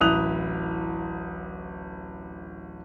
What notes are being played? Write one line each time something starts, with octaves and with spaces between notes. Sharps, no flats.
D1 A1 E4 D#6 F#6 F7